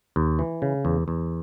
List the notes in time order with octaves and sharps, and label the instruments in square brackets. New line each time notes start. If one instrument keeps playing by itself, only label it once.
[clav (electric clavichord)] D#2
E3
C#3
E2
E2